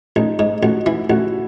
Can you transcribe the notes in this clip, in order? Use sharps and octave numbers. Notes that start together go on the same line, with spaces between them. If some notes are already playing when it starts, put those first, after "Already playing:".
A1 D#4
G#2
A1 F#4
E3 E4
A1 F#4